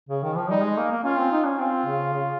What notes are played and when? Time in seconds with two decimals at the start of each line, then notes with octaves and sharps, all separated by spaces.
0.09 C#3
0.23 D#3
0.36 F3
0.50 G3 D#4
0.63 G#3
0.77 A#3
0.91 A#3
1.04 C#4 F4
1.18 C4
1.32 D#4
1.45 C#4
1.58 C4 F4
1.86 C#3
2.13 C#3